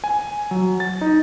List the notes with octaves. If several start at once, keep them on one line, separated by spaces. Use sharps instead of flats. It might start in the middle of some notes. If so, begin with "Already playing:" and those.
G#5
F#3
A6
D#4